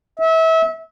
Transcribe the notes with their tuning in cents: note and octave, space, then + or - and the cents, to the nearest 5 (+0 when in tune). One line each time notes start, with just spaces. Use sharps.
E5 -30